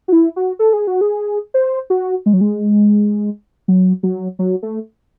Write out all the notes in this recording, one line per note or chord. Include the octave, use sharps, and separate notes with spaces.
F#4
E4
F#4
A4
G#4
F#4
G#4
C5
F#4
G#3
F#3
G#3
F#3
F#3
F#3
A3